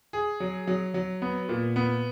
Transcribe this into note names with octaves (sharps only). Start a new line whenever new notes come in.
G#4
F#3
F#3
F#3
B3
A#2
B3